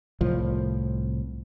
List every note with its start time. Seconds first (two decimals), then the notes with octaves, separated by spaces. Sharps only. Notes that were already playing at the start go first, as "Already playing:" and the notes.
0.21 C2 A2 F3